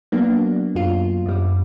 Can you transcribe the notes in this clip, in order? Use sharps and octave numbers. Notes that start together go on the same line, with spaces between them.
F#3 A#3 B3 D4
F#2 F4
F#2 G3